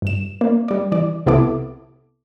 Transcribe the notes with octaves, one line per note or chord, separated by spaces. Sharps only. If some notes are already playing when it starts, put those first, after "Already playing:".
G2 E7
A#3
G3 D5
E3 D5
C2 C3 B3 E4 A4 D6